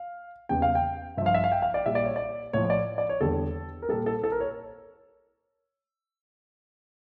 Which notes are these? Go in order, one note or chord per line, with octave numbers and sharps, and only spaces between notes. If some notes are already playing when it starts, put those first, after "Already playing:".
Already playing: F5
E2 C#3 E3 G3 G5
F5
G5
G2 F3 E5 F5
E5
F5
G5
F5
D5
A#2 G3 E5
D5
C#5
D5
A2 F3 C#5
C#5
D5
D5
C#5
E2 D3 G3 A4
A#4
A#2 G3 A4
A4
A4
A#4
C#5